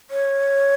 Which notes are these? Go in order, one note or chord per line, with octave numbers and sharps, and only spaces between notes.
C#5